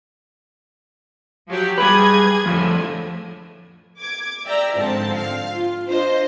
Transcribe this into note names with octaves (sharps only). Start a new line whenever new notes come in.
F3 F#3 G4
G3 G#4 B4 G#6
F2 A2 D3
D6 G#6
D5 E5 G5 A#5
G#2 D3 F3 C4 A5
F5
F4
D4 F4 C5 D#5